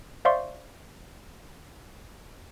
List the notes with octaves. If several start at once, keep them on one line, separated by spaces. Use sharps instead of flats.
C5 D5 E5 F5 C6 C#6